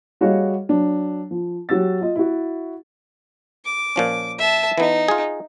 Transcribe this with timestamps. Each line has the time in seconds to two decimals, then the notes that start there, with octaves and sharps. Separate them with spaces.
0.21 G3 F#4 G#4 C#5 D#5 F5
0.69 F#3 D4
1.31 F3
1.69 F#3 F#4 G4 E6 A6
2.01 F4 D#5
2.16 E4 F#4
3.65 D6
3.96 A#2 F3 C#4
4.38 E5 A5
4.78 E3 B3 D#4
5.08 F4 G#4